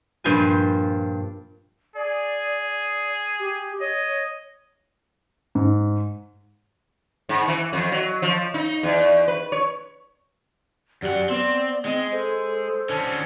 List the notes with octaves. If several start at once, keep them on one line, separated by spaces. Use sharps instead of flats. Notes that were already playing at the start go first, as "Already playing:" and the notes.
G2 A#2 F3 B4 C5 G#5
G#4 D5
G4
C#5 D#5
G#2
G#2
E3
F2
F#3
F3
D#4
E2
B4
C#5
F#2 G4 D5 F#5
B3 C4 D5
G#3 C4 D#5
A4 C5
D3 C#4 A5